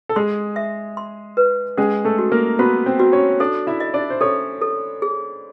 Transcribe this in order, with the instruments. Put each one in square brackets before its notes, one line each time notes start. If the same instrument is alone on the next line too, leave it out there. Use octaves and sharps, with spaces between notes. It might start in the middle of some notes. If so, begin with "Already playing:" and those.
[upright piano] A4
[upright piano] G#3 G#4 [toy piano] C6
[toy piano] E5
C6
B4
[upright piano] G#3 G#4 [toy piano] C#4
[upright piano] A3 A4
[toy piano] F#4
[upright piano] A#3 A#4
[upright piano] B3 B4 [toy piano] F#4
[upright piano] C4 C5
[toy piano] F#4
[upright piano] C#4 C#5
[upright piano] D4 D5 [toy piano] A4
[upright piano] E4 E5
[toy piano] D#5
[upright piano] D4 D5
C5
[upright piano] C#4 C#5 [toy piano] A4
[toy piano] A4
G#4